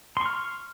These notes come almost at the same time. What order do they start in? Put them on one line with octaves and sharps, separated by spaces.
C6 C#6 F6